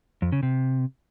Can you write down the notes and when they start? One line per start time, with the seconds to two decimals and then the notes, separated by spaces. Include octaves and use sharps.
0.22 F2
0.32 C#3
0.43 C3